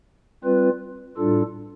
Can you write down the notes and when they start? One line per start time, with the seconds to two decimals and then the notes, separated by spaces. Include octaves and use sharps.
0.44 G3 C4 F4 B4
1.17 A2 G3 D4 F4 A4